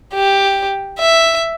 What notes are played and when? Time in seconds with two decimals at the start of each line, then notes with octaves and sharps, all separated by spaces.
0.14 G4
0.99 E5